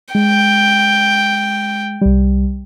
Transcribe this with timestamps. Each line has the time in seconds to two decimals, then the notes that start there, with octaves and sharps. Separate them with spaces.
0.15 G#3 G5
2.01 C2 G3